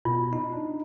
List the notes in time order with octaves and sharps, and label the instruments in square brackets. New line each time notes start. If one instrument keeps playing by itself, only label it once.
[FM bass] B2 [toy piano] F4
[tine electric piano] D#4
[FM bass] D4